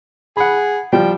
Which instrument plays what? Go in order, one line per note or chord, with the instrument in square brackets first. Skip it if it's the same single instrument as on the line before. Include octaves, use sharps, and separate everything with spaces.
[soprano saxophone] G#4 [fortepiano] F#5 B5
[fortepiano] F3 G3 [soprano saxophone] G5